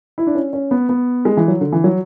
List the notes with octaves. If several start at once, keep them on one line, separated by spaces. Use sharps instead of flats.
E4
D4
C#4
C#4
B3
B3
G#3
E3
F#3
D3
E3
F#3